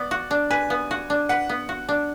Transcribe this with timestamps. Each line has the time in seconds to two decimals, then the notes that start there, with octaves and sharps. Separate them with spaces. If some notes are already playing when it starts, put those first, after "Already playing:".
Already playing: B3 D5
0.11 F#4
0.31 D4
0.51 B4 G#5
0.70 B3
0.91 F#4
1.10 D4
1.29 B4 F#5
1.49 B3
1.69 F#4
1.89 D4